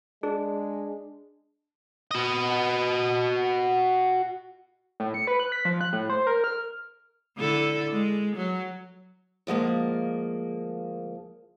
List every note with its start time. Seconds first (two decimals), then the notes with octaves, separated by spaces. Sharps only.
0.23 G#3 D4 G#4
2.11 F#4 D#5
5.00 A2
5.14 C#7
5.27 B4
5.40 F#6
5.52 B6
5.65 F3
5.81 F#6
5.93 A2
6.10 C5
6.27 A#4
6.44 F6
7.37 D3 E4 A4
7.92 G#3
8.37 F#3
9.47 D2 F3 G#3 A#3